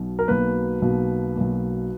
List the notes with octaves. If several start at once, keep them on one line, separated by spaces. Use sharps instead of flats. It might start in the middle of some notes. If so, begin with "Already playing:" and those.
Already playing: B1 B2
A#4
B1 B2 A#3 B4
B1 B2 A#3
B1 B2 A#3